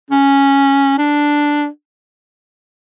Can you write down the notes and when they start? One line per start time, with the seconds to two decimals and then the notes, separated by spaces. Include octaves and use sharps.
0.11 C#4
0.98 D4